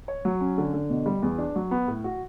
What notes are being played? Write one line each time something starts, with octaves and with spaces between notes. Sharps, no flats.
C#5
F#3
C#4
D3
D3
B2
G3
E2
D4
F#3
B3
A2
F#4